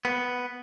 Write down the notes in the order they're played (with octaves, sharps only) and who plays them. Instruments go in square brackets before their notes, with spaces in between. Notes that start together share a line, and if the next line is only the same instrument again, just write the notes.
[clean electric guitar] B3